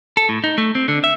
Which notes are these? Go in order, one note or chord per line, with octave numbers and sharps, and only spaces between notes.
A4
A2
D#4
A3
C4
D3
E5